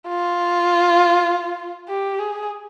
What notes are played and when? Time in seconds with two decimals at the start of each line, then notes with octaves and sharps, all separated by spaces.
0.08 F4
1.89 G4
2.19 G#4